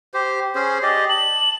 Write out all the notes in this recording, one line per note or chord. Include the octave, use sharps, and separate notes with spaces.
G4 C5
C#4 G#4 C5
G4 D5 D#5
A5 F#7